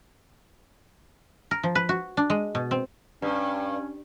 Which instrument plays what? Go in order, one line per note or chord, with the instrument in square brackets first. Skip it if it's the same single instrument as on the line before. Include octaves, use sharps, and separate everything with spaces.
[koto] A#4
F3
B4
F#4
D4
G#3
B2
C4
[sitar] G2 [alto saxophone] C#4